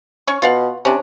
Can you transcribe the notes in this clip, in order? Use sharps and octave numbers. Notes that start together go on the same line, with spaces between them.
C#4 C#6
B2 F4 F5 F#5
C3 C#4 D4